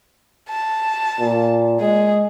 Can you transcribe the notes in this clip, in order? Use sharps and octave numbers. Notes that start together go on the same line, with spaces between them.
A5
A#2
G#3 G#4